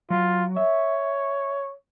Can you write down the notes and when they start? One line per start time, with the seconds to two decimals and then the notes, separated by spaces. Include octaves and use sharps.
0.10 F#3 F4
0.57 C#5 E5